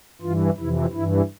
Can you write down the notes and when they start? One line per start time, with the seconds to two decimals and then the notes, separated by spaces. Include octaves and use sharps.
0.21 G2 E3 F4
0.57 F2 C3 E3 E4
0.92 G2 E3 E4